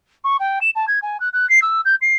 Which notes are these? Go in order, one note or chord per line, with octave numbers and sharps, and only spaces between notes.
C#6
G5
E7
A5
G#6
G#5
F#6
F#6
C7
E6
G6
C7